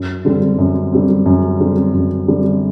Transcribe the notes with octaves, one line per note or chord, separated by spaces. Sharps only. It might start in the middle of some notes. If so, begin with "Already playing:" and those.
Already playing: F#2
D3 G3 C4
F#2
D3 G3 C4
F#2
D3 G3 C4
F#2
D3 G3 C4